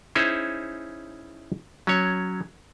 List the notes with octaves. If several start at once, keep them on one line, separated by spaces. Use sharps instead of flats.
C#4 D#4 E4 G#4 C5 C#5
F#3 C#4 C#5